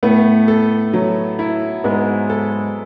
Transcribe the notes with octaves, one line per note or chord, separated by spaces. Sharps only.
A2 A3 B3
A4
F#3
E4
G#2 G#3 B3
A4